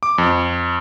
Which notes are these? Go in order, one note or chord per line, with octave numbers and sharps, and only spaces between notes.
D6
F2